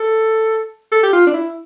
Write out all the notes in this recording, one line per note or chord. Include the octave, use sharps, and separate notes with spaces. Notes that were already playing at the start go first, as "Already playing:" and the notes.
Already playing: A4
A4
G4
F4
D4
E4